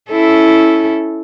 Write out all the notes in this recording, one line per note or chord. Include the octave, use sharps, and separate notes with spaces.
C#4 E4 A4